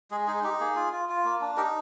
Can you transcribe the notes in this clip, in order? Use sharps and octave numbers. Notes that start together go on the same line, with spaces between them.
G#3 G#4
D#4 G#4
D#4 G4
A#3 G#4
F4
F4
F4
A#3
D4
D#4 G4 A#4